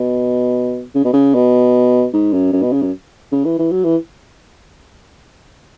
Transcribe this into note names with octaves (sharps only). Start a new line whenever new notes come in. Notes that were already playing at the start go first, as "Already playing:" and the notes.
Already playing: B2
C#3
B2
C#3
B2
G#2
F#2
F#2
B2
C#3
F#2
C#3
E3
E3
F#3
E3